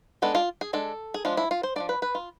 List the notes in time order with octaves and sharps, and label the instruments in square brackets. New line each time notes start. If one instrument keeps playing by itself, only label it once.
[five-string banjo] G#3 B3 D4 A4
F4
G#4
G#3 D4 A4
G#4
F3 G#3 D4 F4
E4
F4
C5
F3 A3 D4 D5
B4
B4
F4